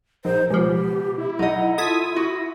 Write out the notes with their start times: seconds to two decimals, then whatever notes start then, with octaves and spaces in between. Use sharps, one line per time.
0.25 A#1 D#4 C5
0.50 C#2 B2 F3 G4
1.18 E4
1.39 B1 D#4 D#5 F#5
1.78 F4 A4 D#6 G#6 B6
2.16 F#4